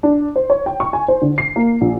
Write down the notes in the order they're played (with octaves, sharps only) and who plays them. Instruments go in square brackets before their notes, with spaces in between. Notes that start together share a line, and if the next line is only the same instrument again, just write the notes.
[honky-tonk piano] D4
C5
C#5
G5
C#6
G#5
C5
D3
C7
A#3
A#1